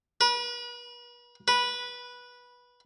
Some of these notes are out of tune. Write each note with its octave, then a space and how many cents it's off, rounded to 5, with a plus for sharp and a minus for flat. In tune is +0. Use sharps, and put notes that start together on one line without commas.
B4 -40
B4 -15